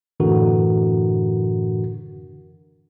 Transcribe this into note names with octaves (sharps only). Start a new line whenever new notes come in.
F#2 A2 D3 E3 F#4 A#4